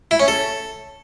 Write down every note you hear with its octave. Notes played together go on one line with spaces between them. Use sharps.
E4
C#4
A4